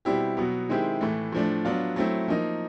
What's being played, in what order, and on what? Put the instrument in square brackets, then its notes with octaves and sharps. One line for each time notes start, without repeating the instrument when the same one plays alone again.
[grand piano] B2 G3 C4 E4 G4
B2 F#3 B3
D#3 G#3 C4 E4 G4
A2 E3 A3
A2 F3 A3 D4
F#3 B3 D4 F4
F#3 A3 C4 E4
F3 A#3 D#4